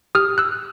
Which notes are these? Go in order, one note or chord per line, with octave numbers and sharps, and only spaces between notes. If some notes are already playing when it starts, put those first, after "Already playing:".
G4 D#6 F6
E6 F#6